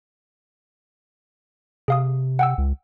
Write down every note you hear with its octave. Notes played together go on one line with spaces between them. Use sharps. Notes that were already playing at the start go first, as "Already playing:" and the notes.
C3 G#4 F5 D#6
F#5 G5 E6
C#2